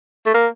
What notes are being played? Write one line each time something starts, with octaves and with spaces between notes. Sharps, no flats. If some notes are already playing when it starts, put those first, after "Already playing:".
A3
A#3